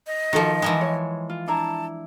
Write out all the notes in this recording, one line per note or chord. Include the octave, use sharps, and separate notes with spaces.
D#5
D#3 F3 F#4 A4
E3 F3 G#3 D#4
C#5
F4
D4 E4 A5 A#5